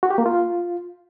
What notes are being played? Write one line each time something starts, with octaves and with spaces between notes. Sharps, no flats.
F#4
G4
A#3
F4